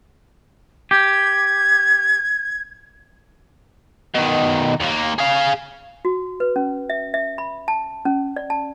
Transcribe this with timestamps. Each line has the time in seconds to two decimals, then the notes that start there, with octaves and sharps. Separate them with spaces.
0.91 G4 G#6
4.15 B2 D#3
4.80 D#2 A#3
5.19 G#4 F5
6.05 F#4
6.40 B4
6.56 C#4
6.90 E5
7.14 E5
7.38 B5
7.68 A5
8.05 C#4
8.36 D5
8.50 A5